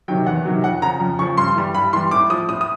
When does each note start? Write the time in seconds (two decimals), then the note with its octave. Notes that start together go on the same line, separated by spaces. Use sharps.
0.08 C3 D#3 F#3 G5
0.26 E2 F#5
0.45 C3 D#3 F#3
0.64 F2 F#5
0.82 C#3 F3 A#5
1.00 F2
1.19 C#3 C#6
1.22 F3
1.37 G2 C6
1.56 E3 G3
1.74 G2 B5
1.93 E3 G3 C6
2.11 A2 D6
2.30 F3 D#6
2.49 A2 D#6
2.61 D#6